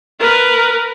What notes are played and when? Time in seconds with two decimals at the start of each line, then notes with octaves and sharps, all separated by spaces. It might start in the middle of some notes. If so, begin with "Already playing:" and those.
0.19 A#4 B4